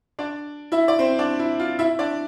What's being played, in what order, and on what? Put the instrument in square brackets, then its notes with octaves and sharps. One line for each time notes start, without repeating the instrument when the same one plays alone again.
[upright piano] D4 D5
E4 E5
D5
C4 C5
D4 D5
E4
F4
E4 E5
D4 D5